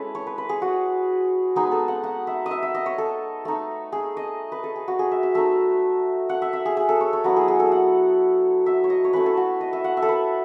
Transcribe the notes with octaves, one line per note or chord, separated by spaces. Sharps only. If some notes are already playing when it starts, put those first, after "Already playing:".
Already playing: G#3 C#4 E4 A4 B4
C#5
B4
B4
G#4
F#4
G#3 B3 D#4 G#4
A4
F#5
F#5
E5
D#5
E5
E5
D#5
C#5
A4
A3 D#4
G#4
D#5
B4
A4
G#4
F#4
G#4
E5
E5
A3 D#4 E5
F#5
E5
E5
G#4
G#4
A4
C#5
C#5
F#3 B3 E4 F#4
G#4
G#4
A4
F#5
E5
C#5
D#5
C#5
A3 C#4 E4 B4
A4
F#4
D#5
E5
F#5
E5
A4
B4